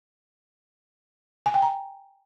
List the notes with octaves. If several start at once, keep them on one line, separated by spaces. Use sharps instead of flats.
G#5
G5
A#5